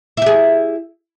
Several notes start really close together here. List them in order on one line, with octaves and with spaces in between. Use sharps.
E4 G4 G#4